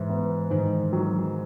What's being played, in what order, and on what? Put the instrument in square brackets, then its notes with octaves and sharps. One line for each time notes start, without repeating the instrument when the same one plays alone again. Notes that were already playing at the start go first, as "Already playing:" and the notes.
Already playing: [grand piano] G#2 [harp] E3
[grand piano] B3
[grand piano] G#2 [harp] D#3
[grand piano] F#3